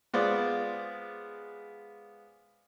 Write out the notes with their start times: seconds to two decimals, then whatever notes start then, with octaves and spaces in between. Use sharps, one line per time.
0.14 G#3 B3 F4 C5 D5